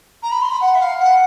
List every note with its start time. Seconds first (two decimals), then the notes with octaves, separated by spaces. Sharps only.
0.22 A#5
0.31 B5
0.41 C6
0.50 B5
0.60 F#5
0.74 E5
0.80 F5
0.99 F#5